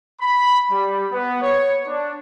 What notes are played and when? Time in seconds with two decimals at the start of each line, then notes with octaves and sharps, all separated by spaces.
0.20 B5
0.71 G3
1.12 B3
1.42 C#5
1.87 D4